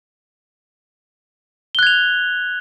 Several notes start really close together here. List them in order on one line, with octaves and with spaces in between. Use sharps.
G7 F#6 G#6 F7